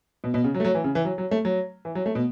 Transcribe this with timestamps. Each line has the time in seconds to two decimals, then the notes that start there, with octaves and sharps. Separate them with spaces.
0.24 B2
0.34 B2
0.44 C#3
0.54 F#3
0.60 A3
0.65 F#3
0.75 E3
0.84 C#3
0.95 E3
1.05 F#3
1.18 F#3
1.31 A3
1.45 F#3
1.85 E3
1.95 F#3
2.06 A3
2.15 B2